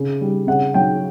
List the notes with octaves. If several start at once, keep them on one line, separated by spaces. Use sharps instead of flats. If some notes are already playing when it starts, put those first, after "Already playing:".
Already playing: C#3
G3
C#3 F#5
F#3 G5